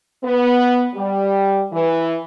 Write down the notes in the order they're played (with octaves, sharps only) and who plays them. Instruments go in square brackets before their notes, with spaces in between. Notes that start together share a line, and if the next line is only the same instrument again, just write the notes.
[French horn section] B3
G3
E3